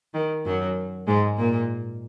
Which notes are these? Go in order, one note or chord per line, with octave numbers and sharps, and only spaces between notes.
D#3
F#2 F#3
G#2 G#3
A#2 A#3